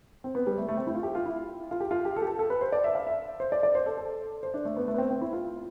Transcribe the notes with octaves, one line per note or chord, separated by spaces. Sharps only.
C4
B3
G3
A3
A3
C4
E4
F4
G4
F4
E4
F4
G4
F4
G4
A4
G4
A4
A4
B4
C5
D5
E5
F5
E5
C5
D5
D5
C5
A4
A4
C5
D4
A3
B3
A3
B3
C4
C4
E4
F4